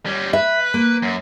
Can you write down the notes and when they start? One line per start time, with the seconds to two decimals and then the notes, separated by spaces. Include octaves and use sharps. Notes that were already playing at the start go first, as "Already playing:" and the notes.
0.06 G3 C#4
0.33 B4 E5
0.74 A#3
1.02 F#2